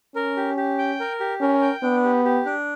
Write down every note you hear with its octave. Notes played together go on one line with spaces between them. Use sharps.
C#4 A#4
G4
G4
G5
A#4
G4
C#4 A#4
G5
B3 D4
G4
G4
D4